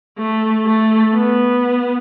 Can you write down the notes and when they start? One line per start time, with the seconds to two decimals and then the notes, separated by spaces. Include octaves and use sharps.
0.18 A3
0.65 A3
1.14 B3